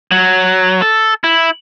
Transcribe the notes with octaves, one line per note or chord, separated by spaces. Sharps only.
F#3
A4
E4